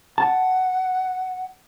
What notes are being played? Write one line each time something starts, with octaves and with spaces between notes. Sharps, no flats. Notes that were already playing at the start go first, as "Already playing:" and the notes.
F#5 A5